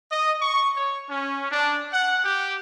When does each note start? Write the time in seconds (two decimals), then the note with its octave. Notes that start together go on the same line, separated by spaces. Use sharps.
0.11 D#5
0.41 C#6
0.76 C#5
1.10 C#4
1.51 D4
1.93 F#5
2.24 G4